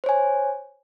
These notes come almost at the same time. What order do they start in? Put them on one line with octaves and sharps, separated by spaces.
C5 C#5 G#5